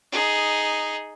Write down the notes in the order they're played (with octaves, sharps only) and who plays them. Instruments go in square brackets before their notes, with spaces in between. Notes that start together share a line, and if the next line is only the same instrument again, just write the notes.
[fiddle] D#4 G#4